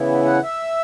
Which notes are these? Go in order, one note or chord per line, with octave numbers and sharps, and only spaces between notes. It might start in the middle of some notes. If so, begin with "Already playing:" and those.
Already playing: C#3 E3 B3 E4
F#5
E5